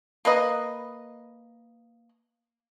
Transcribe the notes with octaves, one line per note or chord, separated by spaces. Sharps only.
A#3 B4 D#5